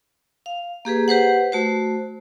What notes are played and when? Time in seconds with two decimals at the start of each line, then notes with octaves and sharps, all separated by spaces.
0.46 F5
0.85 A#3 G4 G#4 B4
1.08 G4 B4 C5 F#5
1.52 A3 F#4 C5